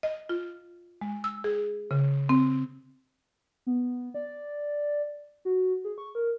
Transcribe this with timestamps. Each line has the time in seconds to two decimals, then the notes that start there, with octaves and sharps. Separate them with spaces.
0.03 D#5
0.29 F4
1.01 G#3
1.24 E6
1.44 G#4
1.91 C#3
2.29 C4
3.67 B3
4.14 D5
5.45 F#4
5.84 G#4
5.98 C#6
6.15 A#4